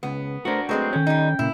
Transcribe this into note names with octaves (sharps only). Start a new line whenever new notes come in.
C#2 B3
A3 D4 F#4 A#4 C5
F#3 G#3 A3 C4 B4 G5
D#3 C#4 A4 C#5
G3 D#4
A#2 C#3 A#3 E4